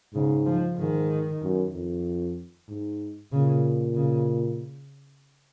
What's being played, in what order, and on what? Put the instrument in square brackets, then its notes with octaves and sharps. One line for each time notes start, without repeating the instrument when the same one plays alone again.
[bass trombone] G#2 [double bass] C#3
[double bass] F3
[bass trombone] G#2 [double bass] D#3
[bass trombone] F#2
F2
G#2
[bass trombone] A#2 [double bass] C#3
[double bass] C#3